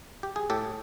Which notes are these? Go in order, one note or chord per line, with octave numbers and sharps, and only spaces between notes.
G4
G#4
A2 G4 A4